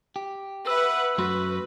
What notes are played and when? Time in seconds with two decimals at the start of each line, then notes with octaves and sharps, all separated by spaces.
0.16 G4
0.67 B4 E5 F#5 E6
1.18 F#2 A3 F#4 B4 C6